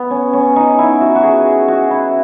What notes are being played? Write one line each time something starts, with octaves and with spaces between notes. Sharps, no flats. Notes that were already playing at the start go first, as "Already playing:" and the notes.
Already playing: B3
C#4
C#4
D#4
E4
F#4
F#4
G#4
F#4
E4